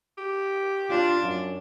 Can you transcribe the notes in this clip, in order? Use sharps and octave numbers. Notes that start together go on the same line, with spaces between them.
G4
D4 F4
F#2